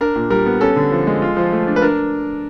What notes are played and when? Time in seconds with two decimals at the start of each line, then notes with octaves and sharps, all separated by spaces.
0.01 D4 A#4
0.16 A#2
0.30 G3 A#4
0.46 B3
0.61 C#4 A4
0.76 D3
0.91 F3
1.07 G#3
1.22 F4
1.37 F3
1.52 A3
1.67 D4
1.76 B4
1.82 D4 A#4